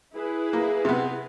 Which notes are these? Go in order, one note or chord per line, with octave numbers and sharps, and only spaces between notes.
E4 G#4 B4
A#3
C3 B3